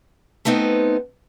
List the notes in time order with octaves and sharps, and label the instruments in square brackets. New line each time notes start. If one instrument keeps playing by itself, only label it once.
[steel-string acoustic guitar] A3 B3 C4 D#4